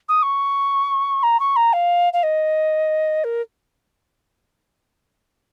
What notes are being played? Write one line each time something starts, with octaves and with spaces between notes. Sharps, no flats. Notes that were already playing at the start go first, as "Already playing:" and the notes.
D#6
C#6
A#5
C#6
A#5
F5
F5
D#5
A#4